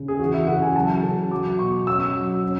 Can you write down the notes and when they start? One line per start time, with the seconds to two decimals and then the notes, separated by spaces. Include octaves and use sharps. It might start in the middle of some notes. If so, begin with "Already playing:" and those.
Already playing: C#3
0.08 G#4
0.19 E3 F#4
0.34 E5
0.47 C#3 F#5
0.62 G#5
0.76 F#3 A5
1.03 C#3
1.31 F#3 D6
1.59 B2 C#6
1.87 C#4 E6
2.15 F#3
2.44 C#4